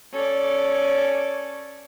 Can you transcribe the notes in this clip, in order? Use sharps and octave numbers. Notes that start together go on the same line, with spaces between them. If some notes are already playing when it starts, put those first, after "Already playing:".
C#4 A4 D5